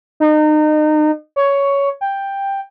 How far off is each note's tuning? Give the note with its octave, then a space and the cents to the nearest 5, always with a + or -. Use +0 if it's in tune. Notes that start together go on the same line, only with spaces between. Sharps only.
D#4 -30
C#5 +10
G5 +10